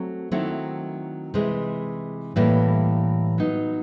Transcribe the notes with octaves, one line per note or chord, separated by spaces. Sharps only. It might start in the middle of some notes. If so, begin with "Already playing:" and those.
Already playing: F#3 A3 C4
D#3 F#3 A3 C4 E4
C3 E3 G#3
A2 E3 G3 A#3
F#3 B3 D#4